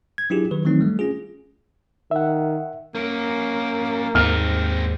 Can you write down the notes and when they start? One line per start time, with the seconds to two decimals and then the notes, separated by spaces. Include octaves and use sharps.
0.18 G#6
0.30 F#3 D4 E4 F4 G4 G#4
0.51 D#3 F#3 B4
0.65 D#3 E3 F#3 A3 C4 D#4
0.81 G3 A3
0.99 C#4 F4 G#4
2.11 D#3 E5 F#5
2.95 A#3 C#4 A#4
4.15 D#2 G#2 C4 D#4 F6